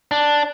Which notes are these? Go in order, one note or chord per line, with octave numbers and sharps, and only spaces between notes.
D4